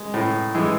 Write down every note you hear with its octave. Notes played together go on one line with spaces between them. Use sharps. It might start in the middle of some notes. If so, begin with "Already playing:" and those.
Already playing: G#3
A2
E3 G#3